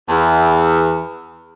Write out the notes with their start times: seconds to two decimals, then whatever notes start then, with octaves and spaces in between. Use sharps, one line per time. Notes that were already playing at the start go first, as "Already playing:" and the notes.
0.09 E2